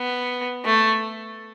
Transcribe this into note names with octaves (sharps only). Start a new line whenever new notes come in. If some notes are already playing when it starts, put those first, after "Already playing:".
Already playing: B3
A3